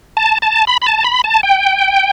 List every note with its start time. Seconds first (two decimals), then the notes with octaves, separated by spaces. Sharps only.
0.17 A5
0.42 A5
0.67 B5
0.82 B5
0.86 A5
1.04 B5
1.24 A5
1.43 G5